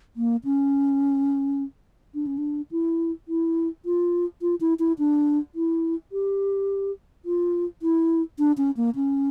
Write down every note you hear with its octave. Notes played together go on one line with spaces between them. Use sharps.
A#3
C#4
D4
C#4
D4
E4
E4
F4
F4
E4
E4
D4
E4
G4
F4
E4
D4
C#4
A#3
C#4